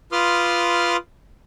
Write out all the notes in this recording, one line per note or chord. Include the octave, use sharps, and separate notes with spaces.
F4 B4 C6 D6 D#6 F6